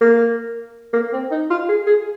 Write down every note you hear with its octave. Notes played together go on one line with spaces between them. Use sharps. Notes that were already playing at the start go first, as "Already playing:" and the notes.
A#3
A#3
C4
D#4
F4
G#4
G#4